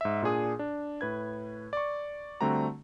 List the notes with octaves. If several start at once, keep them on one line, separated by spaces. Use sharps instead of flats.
G#2 E5
A#2 D4 G#4 D#6
D4
A2 B4 G#6
D5 C#6
D3 G3 A3 C4 F#4 A#5